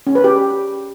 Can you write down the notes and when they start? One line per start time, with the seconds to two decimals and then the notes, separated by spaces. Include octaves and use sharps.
0.07 C#4
0.15 B4
0.24 G4